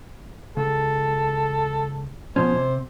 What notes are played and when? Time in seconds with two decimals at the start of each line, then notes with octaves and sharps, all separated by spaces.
0.57 C#2 A4
2.36 B2 F3 C#4 C5
2.56 C3